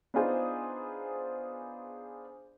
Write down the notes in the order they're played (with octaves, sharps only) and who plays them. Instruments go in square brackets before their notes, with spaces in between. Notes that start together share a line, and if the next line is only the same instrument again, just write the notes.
[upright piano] B3 D4 D#4 F4 G#4 C5